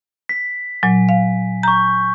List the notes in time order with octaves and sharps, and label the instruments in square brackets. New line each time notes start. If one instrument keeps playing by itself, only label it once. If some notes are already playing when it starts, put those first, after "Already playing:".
[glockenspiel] B6
[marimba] A#2 F#3 [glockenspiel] G#5
[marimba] F5
[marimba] A#5 [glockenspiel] C#6 G6